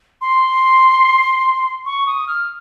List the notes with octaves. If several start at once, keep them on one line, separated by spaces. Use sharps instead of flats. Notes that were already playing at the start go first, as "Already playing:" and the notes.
C6
C#6
D#6
F6